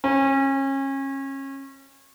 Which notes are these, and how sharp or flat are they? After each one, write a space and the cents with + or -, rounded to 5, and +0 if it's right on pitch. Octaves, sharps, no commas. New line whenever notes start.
C#4 -30